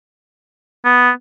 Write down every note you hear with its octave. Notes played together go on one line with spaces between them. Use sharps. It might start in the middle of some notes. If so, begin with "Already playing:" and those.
B3